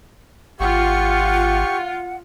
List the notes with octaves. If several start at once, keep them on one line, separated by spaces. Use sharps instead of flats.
G#1 F4 G4 F#5 C#6